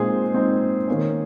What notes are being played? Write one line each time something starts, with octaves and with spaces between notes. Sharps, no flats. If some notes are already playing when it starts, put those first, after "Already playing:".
Already playing: A#2 G#3 C4 D#4 G#4 C5
A#2 G#3 C4 D#4
D#3 A#3 C#4